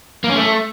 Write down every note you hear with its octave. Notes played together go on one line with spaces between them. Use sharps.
A#3
C#4
A3